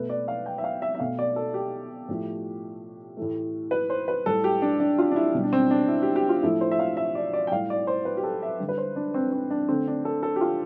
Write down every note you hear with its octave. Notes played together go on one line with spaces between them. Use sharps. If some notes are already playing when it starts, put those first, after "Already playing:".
Already playing: B2 A3 B4
D5
F5
G5
E5
F5
E5
E5
B2 A3 F5
D5
A4
G4
A2 F3 A3
A2 E3 A3
B4
C5
B4
A2 G3 A4
G4
D4
D4
F4
D4
E4
B2 G3
D4
C4
D4
E4
G4
G4
F4
A2 F3 A3 E4
C5
E5
F5
E5
D5
D5
G5
A2 G3 F5
D5
C5
B4
G4
A4
E5
D3 G3
B4
C5
D4
C4
C4
D4
D3 A3 C4
D4
A4
A4
G4
F4